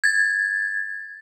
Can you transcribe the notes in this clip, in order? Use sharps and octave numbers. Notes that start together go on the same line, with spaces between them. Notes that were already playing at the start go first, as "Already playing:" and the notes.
G#6 A6